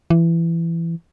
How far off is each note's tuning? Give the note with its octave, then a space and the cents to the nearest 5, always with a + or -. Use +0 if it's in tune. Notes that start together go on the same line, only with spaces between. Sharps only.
E3 +20